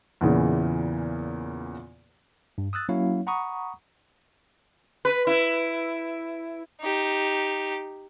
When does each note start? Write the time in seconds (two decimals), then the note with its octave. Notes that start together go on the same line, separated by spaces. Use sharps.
0.21 E2 A#2 C#3 E3
2.58 G2
2.73 D#6 E6 F#6 A6
2.89 F#3 A#3 C#4 E4 C#5 F5
3.27 F#5 A#5 B5 C#6 D#6
5.05 B4
5.27 E4
6.81 D#4 G4